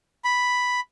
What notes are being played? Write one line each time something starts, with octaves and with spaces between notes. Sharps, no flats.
B5